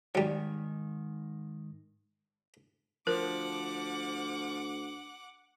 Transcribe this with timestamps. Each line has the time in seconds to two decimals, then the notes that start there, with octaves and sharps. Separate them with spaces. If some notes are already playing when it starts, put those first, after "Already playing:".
0.15 G#2 D#3 F#3 G3
3.07 D2 F3 A#4 F#5 D6